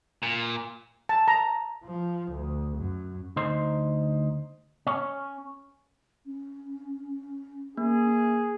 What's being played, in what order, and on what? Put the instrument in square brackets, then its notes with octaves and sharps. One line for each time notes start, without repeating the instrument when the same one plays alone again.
[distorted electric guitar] A#2
[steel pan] A5
A#5
[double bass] F3
D2
F#2
[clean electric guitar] D2 D#4 C5
C#4 C#5
[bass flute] C#4
[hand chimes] A#3 [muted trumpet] G#4